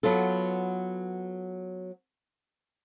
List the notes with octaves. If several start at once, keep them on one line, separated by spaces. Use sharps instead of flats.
F#3 B3 F4 A4